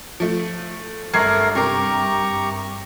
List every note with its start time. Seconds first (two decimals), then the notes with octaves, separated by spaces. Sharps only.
0.20 F3 A3
1.14 G#1 G2 A3 A#4 G#6 C7
1.55 C3 G4 A#4 A#5 C#6